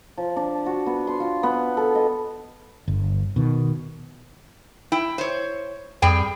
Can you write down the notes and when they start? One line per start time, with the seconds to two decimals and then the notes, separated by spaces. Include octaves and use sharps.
0.18 F3
0.36 D4
0.66 F#4
0.86 B3
1.07 C6
1.20 F4
1.43 B3
1.77 A4
1.95 D#5
2.88 G1
3.36 B2 D#3
4.92 E4 G5
5.18 C5 C#5
6.02 F2 G3 G#4 G5